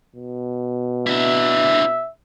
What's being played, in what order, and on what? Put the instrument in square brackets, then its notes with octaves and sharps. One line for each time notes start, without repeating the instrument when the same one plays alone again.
[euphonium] B2
[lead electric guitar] D4 E4 [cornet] E5